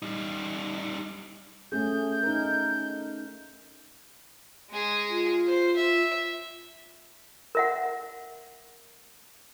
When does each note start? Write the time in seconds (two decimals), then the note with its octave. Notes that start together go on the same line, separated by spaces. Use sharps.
0.02 G3 D#4
1.72 A3 C#4 G#4 G6
2.23 D#4 A#4
4.70 G#3 G#4
5.09 F4
5.46 C5
5.76 E5
7.55 A#4 E5 F#5